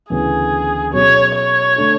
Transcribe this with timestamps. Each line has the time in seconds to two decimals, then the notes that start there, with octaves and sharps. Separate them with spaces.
0.10 D2 C#3 E3 B3 G#4
0.93 B2 F#3 C#4 G#4 C#5
1.34 C#5
1.76 D3 A3 D4 A4